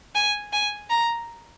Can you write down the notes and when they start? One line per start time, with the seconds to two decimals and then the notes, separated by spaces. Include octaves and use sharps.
0.15 G#5
0.53 G#5
0.90 A#5